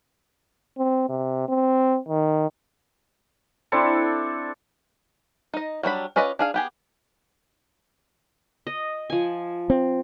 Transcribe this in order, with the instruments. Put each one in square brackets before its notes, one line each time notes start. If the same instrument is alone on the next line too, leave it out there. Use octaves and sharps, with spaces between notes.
[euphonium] C4
C3
C4
D#3
[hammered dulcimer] C4 D4 E4 A4
[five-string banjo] D#4 D#5
F#3 G3 D4 B5
C#4 F4 B4 D5 D#5
D4 G#4 F5
B3 G4 G#4
[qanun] D#5
F3 G#5
[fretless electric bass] C4